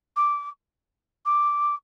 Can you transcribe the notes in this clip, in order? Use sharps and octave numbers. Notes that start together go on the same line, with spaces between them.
D6
D6